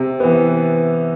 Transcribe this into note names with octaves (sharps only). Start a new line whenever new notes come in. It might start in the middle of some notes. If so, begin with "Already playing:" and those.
Already playing: C3
E3 B3